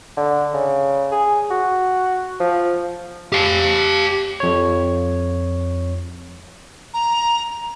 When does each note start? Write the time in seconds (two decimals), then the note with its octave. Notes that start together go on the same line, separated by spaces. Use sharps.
0.17 D3
0.54 C#3
1.12 G#4
1.50 F#4
2.40 F3
3.33 G4 F5
4.40 F2 C#5
6.94 A#5